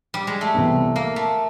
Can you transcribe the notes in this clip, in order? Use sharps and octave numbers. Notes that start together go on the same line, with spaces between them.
G3
G#3
A3
C2 C3 E3 G3 B3
A#3
A3